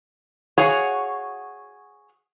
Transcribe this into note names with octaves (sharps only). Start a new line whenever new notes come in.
F#4 G#4 C#5 F5 F#5